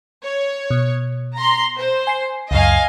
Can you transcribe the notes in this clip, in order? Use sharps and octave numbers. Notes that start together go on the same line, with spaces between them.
C#5
B2
A#5 C6
C5
G#5 C7
C#2 F#2 D#5 F5 G#5